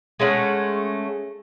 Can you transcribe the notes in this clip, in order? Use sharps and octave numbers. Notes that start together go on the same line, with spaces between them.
G#3 A3 C#4 F#5